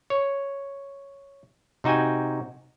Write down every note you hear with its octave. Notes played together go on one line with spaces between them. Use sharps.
C#5
C3 D#4 F#4 G5 G#5